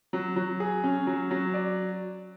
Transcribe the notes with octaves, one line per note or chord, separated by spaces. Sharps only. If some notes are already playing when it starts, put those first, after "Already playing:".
F#3
F#3
G#4
C#4
F#3
F#3
D5